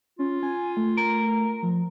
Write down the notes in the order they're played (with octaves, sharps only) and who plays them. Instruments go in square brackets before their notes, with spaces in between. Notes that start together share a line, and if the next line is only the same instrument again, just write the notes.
[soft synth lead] C#4 [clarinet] F4
[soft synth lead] G#5
A3
[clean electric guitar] A#4
[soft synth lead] F3